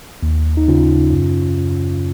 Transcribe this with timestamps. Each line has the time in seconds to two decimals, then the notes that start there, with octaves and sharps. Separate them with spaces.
0.23 D#2
0.57 D#4
0.68 C#3 C#4 F4
1.13 F#2